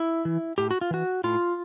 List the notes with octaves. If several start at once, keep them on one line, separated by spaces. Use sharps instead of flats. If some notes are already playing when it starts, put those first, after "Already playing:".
Already playing: E4
E3
A2 G4
F#4
F4
E3 F#4
A2 F4